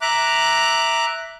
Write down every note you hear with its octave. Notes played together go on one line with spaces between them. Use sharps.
E5 A#5 D6 F#6